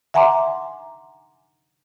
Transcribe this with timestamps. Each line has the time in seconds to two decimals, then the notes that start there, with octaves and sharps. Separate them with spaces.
0.14 E5 F#5 G#5 A#5 C6 D6